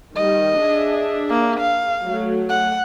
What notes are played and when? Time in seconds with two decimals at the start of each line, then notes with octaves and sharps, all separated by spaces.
0.15 D#3 G3 D#5
0.59 D4 G#4 E5
1.29 A#3
1.60 F5
2.04 F#3 A3
2.49 F#5